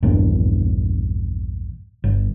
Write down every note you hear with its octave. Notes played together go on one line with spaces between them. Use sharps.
A#1 E2 G2 A#2
G1